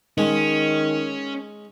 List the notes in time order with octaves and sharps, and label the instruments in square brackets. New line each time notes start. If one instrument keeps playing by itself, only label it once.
[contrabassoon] D#3 [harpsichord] G#3 [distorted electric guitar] C#4